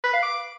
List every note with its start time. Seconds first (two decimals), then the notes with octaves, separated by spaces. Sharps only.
0.04 B4
0.13 F5
0.23 D6